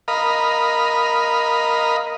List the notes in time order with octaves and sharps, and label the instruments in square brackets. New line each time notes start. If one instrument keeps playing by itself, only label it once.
[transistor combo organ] A#4 D#5 F5 B5